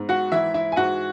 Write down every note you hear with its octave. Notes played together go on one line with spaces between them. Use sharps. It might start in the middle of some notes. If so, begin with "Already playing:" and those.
Already playing: G#2 B3
F#4 F#5
E3 E4 E5
E4 E5
G#5
G#2 F#4 F#5